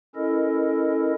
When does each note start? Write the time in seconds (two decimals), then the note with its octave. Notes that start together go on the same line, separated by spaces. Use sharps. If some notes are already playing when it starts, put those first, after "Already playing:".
0.15 C#4 E4 A4 A#4 D#5